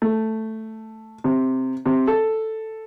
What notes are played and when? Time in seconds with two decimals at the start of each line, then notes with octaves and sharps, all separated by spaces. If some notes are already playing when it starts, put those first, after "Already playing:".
0.02 A3
1.24 C3
1.86 C3
2.07 A4